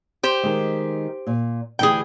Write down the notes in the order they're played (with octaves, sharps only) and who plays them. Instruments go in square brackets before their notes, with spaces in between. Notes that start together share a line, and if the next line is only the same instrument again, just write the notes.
[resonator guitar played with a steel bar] G4 C5
[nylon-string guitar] D#3 G#3
A#2
[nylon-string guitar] D2 E3 G4 [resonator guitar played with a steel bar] G#4 G5